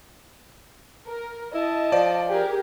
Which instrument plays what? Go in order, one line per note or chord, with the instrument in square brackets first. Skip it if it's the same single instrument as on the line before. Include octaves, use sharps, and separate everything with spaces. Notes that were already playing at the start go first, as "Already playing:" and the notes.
[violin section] A#4
[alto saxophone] E4 [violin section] D#5 A5
[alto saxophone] F3 [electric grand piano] D5
[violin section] G4 G#4 A#4